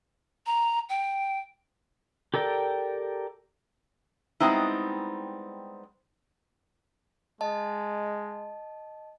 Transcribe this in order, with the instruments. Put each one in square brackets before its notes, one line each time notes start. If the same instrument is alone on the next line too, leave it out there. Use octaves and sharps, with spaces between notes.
[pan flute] A#5
G5
[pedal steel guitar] G4 A4 A#4 D5 G5
[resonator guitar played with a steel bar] G3 G#3 B3 C4 D#4 E4
[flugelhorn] G#3 [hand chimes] D#5 A5